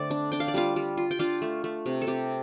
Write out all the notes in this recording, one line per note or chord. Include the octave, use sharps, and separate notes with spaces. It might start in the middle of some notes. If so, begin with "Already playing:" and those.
Already playing: D3 A3 C4 A4 D5
D4
D4 G5
F5
D5
G3 F4 F5
G3
F4
G5
D4 F4 F5
A3
A3
C3
A4
C3 G4